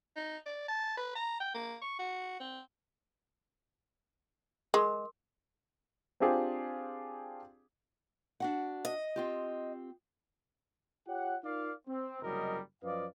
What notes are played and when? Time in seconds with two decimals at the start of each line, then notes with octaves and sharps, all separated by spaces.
0.16 D#4
0.46 D5
0.69 A5
0.97 B4
1.16 A#5
1.40 G5
1.55 A#3
1.82 C#6
1.99 F#4
2.40 C4
4.74 G#3 A#4 C6 D6
6.20 C4 D4 F4 G4 G#4 C5
8.40 D4 F#4 F#5
8.85 D#5
9.16 C4 F4 G4
11.08 F4 G4 C#5 F#5
11.44 D#4 F4 A#4 D5 F5
11.88 C4
12.22 F#1 C2 F#3 G3 A#4 D#5
12.83 F#2 F3 B4 D5 D#5 F5